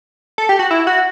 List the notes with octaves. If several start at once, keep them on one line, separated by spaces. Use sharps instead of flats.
A4
G4
F#4
E4
F#4